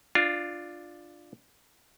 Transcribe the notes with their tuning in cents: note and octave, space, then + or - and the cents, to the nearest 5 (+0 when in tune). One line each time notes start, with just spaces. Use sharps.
D4 +10 F4 +0